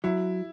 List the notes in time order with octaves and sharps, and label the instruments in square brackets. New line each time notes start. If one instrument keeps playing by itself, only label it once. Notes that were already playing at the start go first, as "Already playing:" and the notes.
[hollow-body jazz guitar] F#3 [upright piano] E4